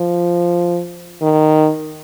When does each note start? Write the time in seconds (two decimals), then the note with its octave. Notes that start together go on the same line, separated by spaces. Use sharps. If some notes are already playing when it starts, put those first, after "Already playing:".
Already playing: F3
1.22 D#3